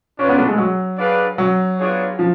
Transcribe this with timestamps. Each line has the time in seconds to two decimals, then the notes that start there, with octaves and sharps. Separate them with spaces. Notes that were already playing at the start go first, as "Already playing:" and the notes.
0.18 C#4 D4 F4 B4 D5
0.29 B3
0.38 A3
0.48 G#3
0.58 F#3
0.98 D4 G#4 B4 D5 F5
1.38 F#3
1.78 B3 D4 F4 G#4 C#5
2.19 F3